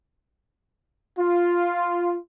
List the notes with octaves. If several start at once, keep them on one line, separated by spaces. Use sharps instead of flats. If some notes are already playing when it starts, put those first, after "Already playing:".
F4